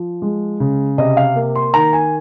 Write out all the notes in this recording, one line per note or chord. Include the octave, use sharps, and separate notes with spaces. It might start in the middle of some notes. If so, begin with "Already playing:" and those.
Already playing: F3
G#3
C#3
C3 D#5
F5
A#3
C6
D#3 A#5
G#5